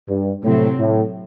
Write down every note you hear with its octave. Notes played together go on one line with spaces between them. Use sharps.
G2
A2 C3 F#3 C4
A2